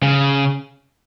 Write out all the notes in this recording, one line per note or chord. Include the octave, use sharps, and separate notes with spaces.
C#3